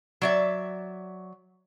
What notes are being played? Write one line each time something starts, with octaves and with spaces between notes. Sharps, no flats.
F#3 D5 E5